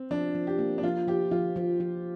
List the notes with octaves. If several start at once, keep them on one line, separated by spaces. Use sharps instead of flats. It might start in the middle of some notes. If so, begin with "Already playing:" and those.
Already playing: C4
F3 D4
F3
G4
A#3
D4
F3 F4
F3 G4
F3 F4
F3
F3